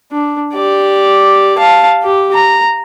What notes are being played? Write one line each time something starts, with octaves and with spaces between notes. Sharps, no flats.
D4
G4 D5
F5 A5
G4
A#5